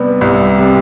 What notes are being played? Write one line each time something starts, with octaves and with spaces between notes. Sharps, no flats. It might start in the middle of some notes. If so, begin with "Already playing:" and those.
Already playing: C3 G3 B3
C2
C3